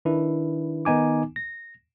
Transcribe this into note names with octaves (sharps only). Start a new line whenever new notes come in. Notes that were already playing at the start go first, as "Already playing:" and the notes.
D#3 D4 E4 B4
D#3 B3 D#4 G#5 D6
A#6